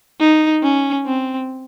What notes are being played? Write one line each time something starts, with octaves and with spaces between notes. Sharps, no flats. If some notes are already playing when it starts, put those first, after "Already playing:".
D#4
C#4
C4